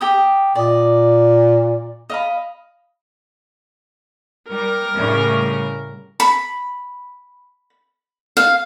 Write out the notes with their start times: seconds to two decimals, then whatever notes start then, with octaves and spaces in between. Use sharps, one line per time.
0.01 G4 G5 D#6
0.55 A#2 D5 D#5
2.10 D#5 F5 B5
4.48 G3 A#4
4.95 A2 C#3 G3
6.20 B5
8.37 F5